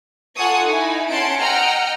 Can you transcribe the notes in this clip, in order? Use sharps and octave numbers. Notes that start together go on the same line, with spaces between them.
F4 A4 F#5 G#5 C#6 D#6
D#4 E4 G#5
C#4 F#5 A5 C6 D7
D#5 F#5 G5 A#5 F6